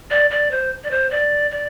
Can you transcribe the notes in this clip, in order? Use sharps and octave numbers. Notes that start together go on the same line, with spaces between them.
D5
D5
C5
D5
C5
D5
D5